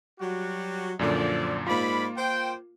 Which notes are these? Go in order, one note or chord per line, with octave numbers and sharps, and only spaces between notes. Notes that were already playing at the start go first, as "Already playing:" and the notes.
F#3 G3 F#4
F#2 A#2 D3 F3 D5
G#2 A#3 F4 D5 B5
C5 G5